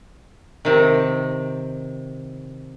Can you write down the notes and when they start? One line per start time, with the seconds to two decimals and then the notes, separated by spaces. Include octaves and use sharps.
0.65 C3 D#3